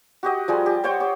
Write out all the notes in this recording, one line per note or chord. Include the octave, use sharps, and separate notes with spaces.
F#4 G4 D#5
F3 G3 G#4 G#5
G4
C5 C#5 F#5 G5
G4 C#5